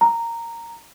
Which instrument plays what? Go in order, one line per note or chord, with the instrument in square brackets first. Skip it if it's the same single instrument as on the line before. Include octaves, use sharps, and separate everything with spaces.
[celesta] A#5